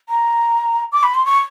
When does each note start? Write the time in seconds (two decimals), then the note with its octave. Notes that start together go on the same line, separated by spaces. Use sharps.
0.09 A#5
0.92 D6
1.03 B5
1.15 C6
1.26 C#6